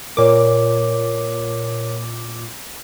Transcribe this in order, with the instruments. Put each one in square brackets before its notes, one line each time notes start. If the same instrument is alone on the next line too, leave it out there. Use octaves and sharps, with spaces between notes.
[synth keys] A#2 D6 [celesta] A#4 C#5